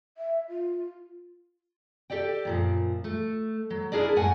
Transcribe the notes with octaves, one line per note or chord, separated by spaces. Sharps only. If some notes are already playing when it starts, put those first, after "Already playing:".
E5
F4
G4 A4 D5 G5
F#2 A#2 F3
A3
F#3
D4 E4 G#4 A#4 D5
F#2 A2 F#5 G#5